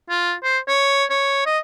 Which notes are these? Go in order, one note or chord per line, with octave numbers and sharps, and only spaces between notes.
F4
C5
C#5
C#5
D#5